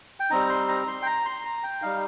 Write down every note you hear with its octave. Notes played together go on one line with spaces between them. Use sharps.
G5
G3 C4 D#4 A#5
C6
A#5
C6
G5
A#5
C6
A#5
G5
G3 D#4 F5